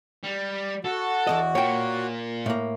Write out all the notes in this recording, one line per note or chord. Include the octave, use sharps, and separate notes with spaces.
G3
F#4 A4
E2 G#2 D#5
A#2 C#5 G5
A2 A#3